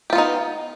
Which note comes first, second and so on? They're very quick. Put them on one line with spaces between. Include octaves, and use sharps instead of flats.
G4 F4 B3 D#4